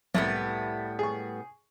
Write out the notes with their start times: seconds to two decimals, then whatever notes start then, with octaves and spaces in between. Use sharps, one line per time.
0.15 C2 A2 G3 B3
0.99 G#4 C#6